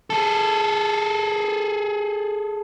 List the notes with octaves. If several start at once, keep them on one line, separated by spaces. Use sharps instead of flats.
G#4 A4